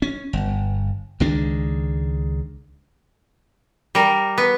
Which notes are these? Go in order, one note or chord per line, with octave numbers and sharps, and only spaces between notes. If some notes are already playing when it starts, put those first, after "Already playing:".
C#4
G1
C#2 D#3 G#3 D4
G3 A#4
B3